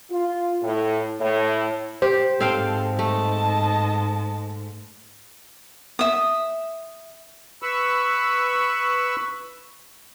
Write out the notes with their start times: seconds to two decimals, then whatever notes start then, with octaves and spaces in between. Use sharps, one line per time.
0.10 F4
0.62 A2
1.20 A2
2.02 G4 C5
2.40 G#2 C4 A4 F5 G5
2.99 A3 D#5 A5
5.99 E5 D#6
7.63 B4 B5 C#6 E6